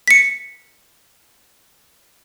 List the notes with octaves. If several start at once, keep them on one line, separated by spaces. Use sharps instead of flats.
B6 C#7